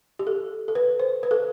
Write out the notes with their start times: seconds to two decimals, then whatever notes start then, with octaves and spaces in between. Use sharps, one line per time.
0.19 G4
0.27 A4
0.68 A4
0.75 B4
1.00 C5
1.23 B4
1.31 A4